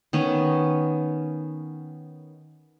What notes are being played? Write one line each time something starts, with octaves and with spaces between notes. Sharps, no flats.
D#3 B3 C#4